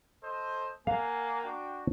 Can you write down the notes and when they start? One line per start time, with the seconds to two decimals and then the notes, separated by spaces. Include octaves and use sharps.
0.23 A4 C5 D#5
0.87 A#3 F5 F#5 G#5
1.42 D4 F#4 G5